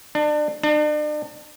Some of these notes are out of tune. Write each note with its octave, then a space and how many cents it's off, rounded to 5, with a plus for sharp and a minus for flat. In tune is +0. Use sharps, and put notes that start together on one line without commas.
D4 +30
D4 +40